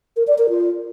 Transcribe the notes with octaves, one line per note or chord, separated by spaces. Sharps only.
A#4
D5
A#4
F4